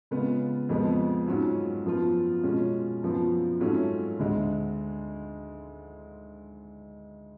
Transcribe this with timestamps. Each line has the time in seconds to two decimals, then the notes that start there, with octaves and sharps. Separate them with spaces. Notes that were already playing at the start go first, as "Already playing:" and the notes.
0.11 C#3 G#3 B3 F4
0.69 F2 F3 G#3 B3
1.28 G#2 F#3 C#4 F4
1.85 F#2 F3 B3 F4
2.43 B2 G#3 C#4 F4
3.03 F#2 F3 B3 F4
3.60 G#2 F#3 A3 C#4 F4
4.19 D2 D3 G#3